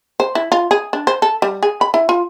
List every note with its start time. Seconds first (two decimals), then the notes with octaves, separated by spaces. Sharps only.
0.20 C5
0.35 E4
0.52 F4
0.71 G#4
0.93 D4
1.07 C5
1.22 A4
1.42 G3
1.63 G#4
1.81 B5
1.94 E4
2.09 F4